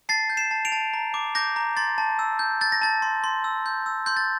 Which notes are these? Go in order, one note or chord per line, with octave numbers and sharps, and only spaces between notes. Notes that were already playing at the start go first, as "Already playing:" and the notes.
A5 A6 C7
G6
C7 E7
A5
D7 F7
A5
A#5
D6
D6 G6 A#6
A#5
C6 A6
A5
E6
G6
G6 A6
A#6
A5 A6
C6
C6
E6
G6
E6
C6 G6
A6